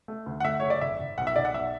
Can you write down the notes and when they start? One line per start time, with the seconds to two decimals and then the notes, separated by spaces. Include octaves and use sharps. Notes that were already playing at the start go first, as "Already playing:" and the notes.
0.08 A3
0.26 D2
0.40 F#5
0.45 A3 E5
0.60 F#1 C#5
0.70 D5
0.81 G#1 E5
1.00 G#1
1.18 B1 F#5
1.27 E5
1.36 B1 D5
1.45 F#5
1.54 B1 E5